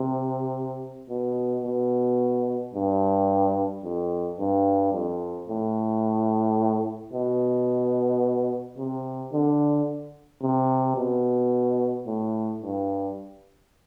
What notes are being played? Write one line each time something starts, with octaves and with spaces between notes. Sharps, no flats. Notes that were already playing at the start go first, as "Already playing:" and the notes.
Already playing: C3
B2
B2
G2
F2
G2
F2
A2
B2
C3
D3
C3
B2
A2
G2